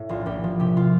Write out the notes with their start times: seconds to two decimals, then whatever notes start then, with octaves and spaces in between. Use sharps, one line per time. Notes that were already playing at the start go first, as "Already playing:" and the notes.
Already playing: A2
0.09 A#1 F4
0.26 A#1 G4
0.44 F3
0.60 C3 G4
0.77 F4